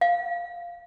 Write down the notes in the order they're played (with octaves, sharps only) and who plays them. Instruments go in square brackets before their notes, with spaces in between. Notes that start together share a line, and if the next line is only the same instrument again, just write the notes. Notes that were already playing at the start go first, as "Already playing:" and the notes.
[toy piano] F5